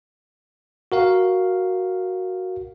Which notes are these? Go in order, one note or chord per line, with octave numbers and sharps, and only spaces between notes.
F#4 A#4 F5